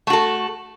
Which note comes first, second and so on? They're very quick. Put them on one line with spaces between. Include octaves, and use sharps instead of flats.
A3 F#4 A4